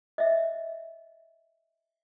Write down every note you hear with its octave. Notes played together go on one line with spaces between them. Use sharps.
D#5 E5